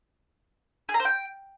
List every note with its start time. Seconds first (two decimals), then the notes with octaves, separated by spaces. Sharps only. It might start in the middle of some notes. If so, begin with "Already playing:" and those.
0.89 G#4
0.94 A#5
1.00 C5
1.05 G5